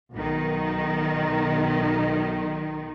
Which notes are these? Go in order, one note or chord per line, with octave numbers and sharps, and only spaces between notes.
B1 D#3